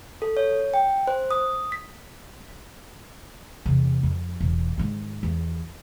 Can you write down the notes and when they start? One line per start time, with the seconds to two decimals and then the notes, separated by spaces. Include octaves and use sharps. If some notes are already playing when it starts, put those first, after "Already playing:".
0.22 A4
0.37 C#5
0.74 G5
1.07 C5
1.31 D#6
1.72 B6
3.65 E2 C3
4.03 F2
4.40 E1
4.78 G#2 D#3
5.23 E2